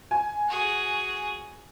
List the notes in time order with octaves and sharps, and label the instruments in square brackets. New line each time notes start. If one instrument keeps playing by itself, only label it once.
[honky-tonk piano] G#5
[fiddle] F#4 G#4